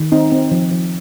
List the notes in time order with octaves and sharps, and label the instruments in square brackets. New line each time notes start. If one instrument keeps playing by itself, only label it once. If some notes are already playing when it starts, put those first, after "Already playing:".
Already playing: [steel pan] D#3
C4 D#4
C4
F3
F3